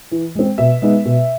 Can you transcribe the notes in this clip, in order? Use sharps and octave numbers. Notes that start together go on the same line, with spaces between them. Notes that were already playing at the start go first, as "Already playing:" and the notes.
E3
G#3 C4
B2 E5
G#3 B3 D#4
B2